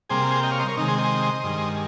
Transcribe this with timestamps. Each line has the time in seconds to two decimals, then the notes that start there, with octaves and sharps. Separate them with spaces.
0.09 C3 G3 A#3 G#4 C5
0.43 D#5 G5
0.52 C#5 F5
0.60 C5 D#5
0.68 A#4 C#5
0.77 C3 D#3 G#3 D#4
0.88 G#4 C5
0.99 C5 D#5
1.44 G2 D#3 G#3